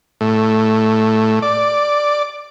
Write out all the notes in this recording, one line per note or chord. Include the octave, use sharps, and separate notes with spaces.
A2
D5